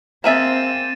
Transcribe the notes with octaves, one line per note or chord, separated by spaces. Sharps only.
A#3 C4 G#4 E5 A6 D#7 E7